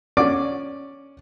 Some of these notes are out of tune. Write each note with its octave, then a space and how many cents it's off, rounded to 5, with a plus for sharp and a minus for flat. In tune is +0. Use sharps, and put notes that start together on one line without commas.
C#4 +0 D5 +0 D6 +5